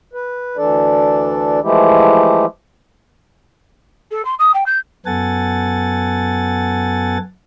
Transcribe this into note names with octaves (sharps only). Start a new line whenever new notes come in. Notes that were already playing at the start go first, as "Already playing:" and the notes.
B4
D2 E3 D4 A4 D5
E3 F3 G#3 A3 E4 G4
A4
C6
D#6
G5
G6
F#2 B3 A4 F#5 G#5 A6